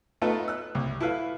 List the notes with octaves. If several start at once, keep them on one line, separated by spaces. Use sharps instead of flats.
A3 B3 D#4 F4 A4 B4
E6 F#6
C2
E4 A4 B4 F5